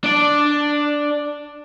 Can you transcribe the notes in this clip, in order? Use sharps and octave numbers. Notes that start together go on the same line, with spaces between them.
D4 D5